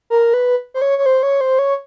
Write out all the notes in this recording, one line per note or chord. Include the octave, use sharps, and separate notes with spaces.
A#4
B4
C5
C#5
C#5
C5
C#5
C5
C#5